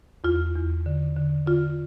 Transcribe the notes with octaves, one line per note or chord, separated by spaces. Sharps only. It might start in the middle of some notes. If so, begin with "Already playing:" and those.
E2 F4
E2
D3
D3
D3 F4